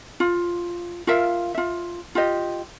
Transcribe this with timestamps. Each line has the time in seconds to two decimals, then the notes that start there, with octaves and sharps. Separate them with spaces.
0.20 F4
1.07 F4 A#4 E5 F5
1.55 F4 E5
2.15 F4 G4 D#5